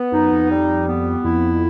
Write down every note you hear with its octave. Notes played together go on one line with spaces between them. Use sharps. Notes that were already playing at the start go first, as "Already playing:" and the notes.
Already playing: B3
F#2 D#4
F2
G3
B3
F2 E4